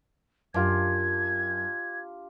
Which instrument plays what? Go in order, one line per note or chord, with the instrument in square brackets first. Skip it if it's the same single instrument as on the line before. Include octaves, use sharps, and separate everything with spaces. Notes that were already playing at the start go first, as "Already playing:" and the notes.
[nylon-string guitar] F#2 [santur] D4 F4 G4 [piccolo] G#6